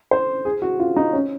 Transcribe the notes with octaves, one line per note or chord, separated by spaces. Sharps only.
C5
G#4
F#4
F4
D#4
C#4